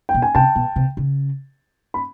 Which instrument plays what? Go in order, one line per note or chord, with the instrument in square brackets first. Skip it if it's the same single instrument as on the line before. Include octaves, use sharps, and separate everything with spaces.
[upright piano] G5
[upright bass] B2
[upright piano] G#5
[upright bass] C3 [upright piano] G5 A5
[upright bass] B2
C3
C#3
[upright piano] B5